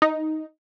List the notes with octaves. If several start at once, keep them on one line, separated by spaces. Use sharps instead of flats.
D#4